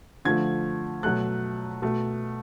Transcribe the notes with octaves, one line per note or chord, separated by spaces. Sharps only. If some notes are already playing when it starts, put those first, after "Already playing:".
D3 F3 A3 G#6
B2 F#3 A3 F#6
B2 A3